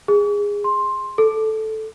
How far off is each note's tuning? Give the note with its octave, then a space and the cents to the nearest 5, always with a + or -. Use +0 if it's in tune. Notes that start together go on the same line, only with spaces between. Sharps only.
G#4 -20
C6 +10
A4 -5